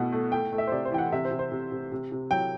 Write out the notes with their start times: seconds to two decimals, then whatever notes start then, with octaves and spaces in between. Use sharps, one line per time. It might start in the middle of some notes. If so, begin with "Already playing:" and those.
Already playing: B2 A3 F#5
0.12 A3
0.32 A3 G5
0.53 A3
0.58 E5
0.67 C5
0.72 C3 D5
0.85 C5
0.92 E3 G5
0.98 F#5
1.12 C3 E5
1.25 C5
1.31 C3
1.39 C5
1.52 C3
1.72 C3
1.92 C3
2.12 C3
2.31 F#3 G5